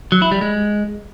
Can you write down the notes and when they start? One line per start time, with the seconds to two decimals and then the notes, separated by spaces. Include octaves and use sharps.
0.12 F#3
0.22 E4
0.32 G3
0.41 G#3